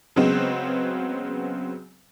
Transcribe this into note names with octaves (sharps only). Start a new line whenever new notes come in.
C#3 F#3 G#3 B3 C4